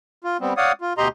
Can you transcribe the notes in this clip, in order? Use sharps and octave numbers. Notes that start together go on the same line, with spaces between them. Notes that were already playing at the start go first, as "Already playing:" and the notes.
F4
G3 B3 C4
C#5 D5 F5 F#5 D#6
F4
D2 B2 G4 D#5 A#5 C6